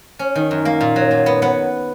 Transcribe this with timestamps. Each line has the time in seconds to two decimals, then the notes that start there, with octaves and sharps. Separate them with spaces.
0.19 C#4
0.36 D#3
0.51 F#2
0.65 A#3
0.81 A#2
0.96 F#3
1.11 A#2
1.26 B3
1.42 B3 F#5